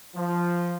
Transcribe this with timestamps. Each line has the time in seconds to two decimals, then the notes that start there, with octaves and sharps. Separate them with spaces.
0.15 F3